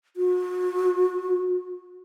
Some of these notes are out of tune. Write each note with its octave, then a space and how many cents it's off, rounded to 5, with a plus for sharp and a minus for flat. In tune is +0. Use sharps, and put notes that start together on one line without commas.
F#4 -35